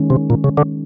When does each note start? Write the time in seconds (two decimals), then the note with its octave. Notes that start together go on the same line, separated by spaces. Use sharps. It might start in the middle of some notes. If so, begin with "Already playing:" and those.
Already playing: D#3 G#3 C#4
0.10 C3
0.30 A#2
0.44 C#3
0.57 D3